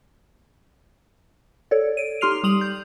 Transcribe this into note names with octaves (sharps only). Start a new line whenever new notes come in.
A4 C#5 D5
D7 D#7
D#4 G4 C6 F6 C7 F7
G3 D#6 F7 F#7
G6